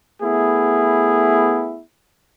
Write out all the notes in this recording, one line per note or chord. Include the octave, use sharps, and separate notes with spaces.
A3 B3 E4 G#4